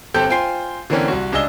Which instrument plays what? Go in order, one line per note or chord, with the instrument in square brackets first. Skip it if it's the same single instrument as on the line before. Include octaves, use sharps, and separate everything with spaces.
[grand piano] G1 C4 G4 A4 G6
F4 C5 G5 G#5 C6 C7
D3 E3 A#3 C4 C#4
C2 F#4
C#2 D4 G#4 D#5 E6 G7